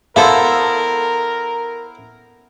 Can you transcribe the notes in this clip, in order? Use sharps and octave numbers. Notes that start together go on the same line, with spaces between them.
B3 E4 A4 A#4 C5 F5 C6